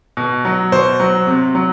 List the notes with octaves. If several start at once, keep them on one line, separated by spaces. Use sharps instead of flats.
B2
F#3
B2 C5
F#3
C3
F#3